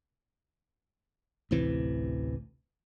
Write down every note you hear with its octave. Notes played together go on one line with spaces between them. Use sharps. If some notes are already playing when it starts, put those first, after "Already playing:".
A1 D2 C3 E3